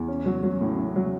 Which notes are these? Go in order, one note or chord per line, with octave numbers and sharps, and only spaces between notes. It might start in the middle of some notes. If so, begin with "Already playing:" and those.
Already playing: E2
C#4
F#3
F#3
A2
A2
F#3